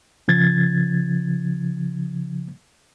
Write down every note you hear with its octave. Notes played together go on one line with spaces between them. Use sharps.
C#3 F3 G#6 A6